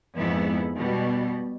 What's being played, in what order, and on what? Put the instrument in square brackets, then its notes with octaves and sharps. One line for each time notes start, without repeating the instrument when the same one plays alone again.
[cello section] F2 G#2 B3 E4
B2 G3